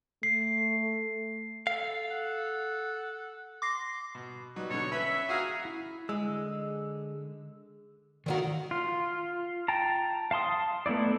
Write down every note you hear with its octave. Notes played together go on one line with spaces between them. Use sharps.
A3 C7
A4 F5
F#5
C6 D6 A#6 C7
B2
F#3 G3 B3 D#4
B2 D3 C#5
C#4 B4 E5 B5
F#4 G#4 F5 A#5
E4
D3 G#3 E6
D3 D#3 A#3 F#4 D5 A#5
F4
G5 A5 A#5
F5 A5 C6 D#6
A3 B3 D#4 E4 D5